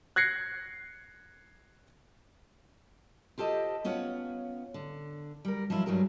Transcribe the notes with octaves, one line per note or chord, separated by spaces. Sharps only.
F#6 G#6 A#6 C7 C#7
F4 G4 A4 C5 D#5
B3 C#4 F4 C#5 F#5
D3
G3 A#4
F3 F#3 E4 F4
G2 F#3 G3 G#4 A#4